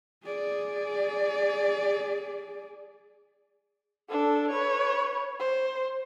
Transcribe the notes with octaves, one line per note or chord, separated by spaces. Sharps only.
G#4 D5
D4 A4
B4 C#5
C5